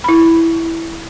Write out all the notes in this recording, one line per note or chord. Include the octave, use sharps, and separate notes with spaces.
E4 B5